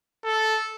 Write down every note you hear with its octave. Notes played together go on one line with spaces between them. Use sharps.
A4